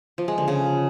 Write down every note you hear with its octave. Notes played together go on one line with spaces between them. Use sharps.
F3
G#3
D3
C#3